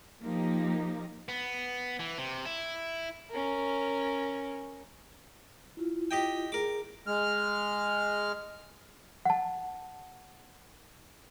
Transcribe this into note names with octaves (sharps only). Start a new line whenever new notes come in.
F3 A#3 D#4 G4
B3
E3
C3
E4
C#4 A#4
E4 F4
G4 D#5 G5
G#4 A#4 D6
G#3 F6
F#5 A5